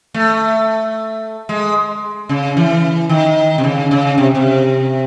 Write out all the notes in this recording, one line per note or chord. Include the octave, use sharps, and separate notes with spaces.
A3
G#3
C#3
E3
D#3
C3
C#3
C#3
C3
C3